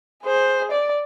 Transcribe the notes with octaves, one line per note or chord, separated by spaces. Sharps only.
G#4 C5
D5